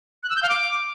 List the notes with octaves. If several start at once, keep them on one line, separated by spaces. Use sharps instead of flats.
F#6
E6
G6
F5
D6